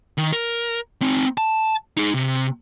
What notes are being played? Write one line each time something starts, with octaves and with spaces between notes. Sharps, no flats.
D#3
A#4
C4 D#4
A5
D#4 G#4
C3